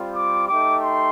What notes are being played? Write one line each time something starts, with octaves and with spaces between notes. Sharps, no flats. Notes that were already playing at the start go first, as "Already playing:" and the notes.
Already playing: G3 C4 F4
D6
A3 D#4 G4 D6
C6